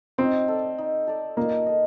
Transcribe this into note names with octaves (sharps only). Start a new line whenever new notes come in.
C4 D#4
A4 D5
D#4
A4 D5
A#3 D#4
A4 D#5